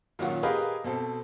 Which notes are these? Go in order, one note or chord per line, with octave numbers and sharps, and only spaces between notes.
A#2 D#3 F#3 C#4 F4 F#4
G4 G#4 A#4 B4 D#5 F5
B2 C4 A4